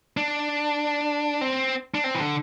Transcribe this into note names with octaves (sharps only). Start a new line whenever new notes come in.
D4
C4
D4
C4
E3
D3